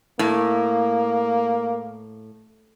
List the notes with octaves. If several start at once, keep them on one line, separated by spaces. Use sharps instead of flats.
A2 A#3